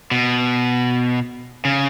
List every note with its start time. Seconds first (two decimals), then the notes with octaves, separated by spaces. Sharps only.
0.11 B2
1.65 C#3